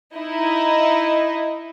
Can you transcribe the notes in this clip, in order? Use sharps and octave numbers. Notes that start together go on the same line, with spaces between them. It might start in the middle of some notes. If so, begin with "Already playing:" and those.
D#4 E4 D#5